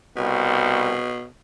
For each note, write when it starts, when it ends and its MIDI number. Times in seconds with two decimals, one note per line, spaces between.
0.17 0.96 36
0.17 1.25 47